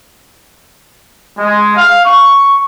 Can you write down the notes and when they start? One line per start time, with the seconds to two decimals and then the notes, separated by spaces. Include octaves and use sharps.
1.38 G#3
1.76 F5
2.06 C#6